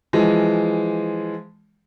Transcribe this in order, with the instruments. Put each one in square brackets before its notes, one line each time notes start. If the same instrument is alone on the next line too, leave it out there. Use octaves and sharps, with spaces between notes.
[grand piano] E3 F3 G#3